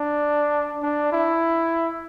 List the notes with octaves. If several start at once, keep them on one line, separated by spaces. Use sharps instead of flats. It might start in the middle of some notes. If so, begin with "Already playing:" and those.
Already playing: D4
D4
E4